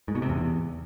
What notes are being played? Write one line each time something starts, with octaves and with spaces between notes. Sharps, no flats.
G#2
B2
C3
E2